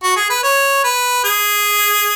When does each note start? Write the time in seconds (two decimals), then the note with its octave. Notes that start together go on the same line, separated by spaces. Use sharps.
0.03 F#4
0.16 G#4
0.30 B4
0.43 C#5
0.84 B4
1.24 G#4